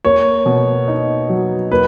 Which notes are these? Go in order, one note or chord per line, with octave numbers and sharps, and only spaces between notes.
A#3 C#5
B2
D#4
F#3
A#3 B4